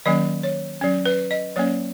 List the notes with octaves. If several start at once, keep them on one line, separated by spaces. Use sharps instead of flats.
D#3 F#3 A#3 C#4 D#5
C#5
F#3 C#4
B4
D#5
F#3 A#3 C#4 C#5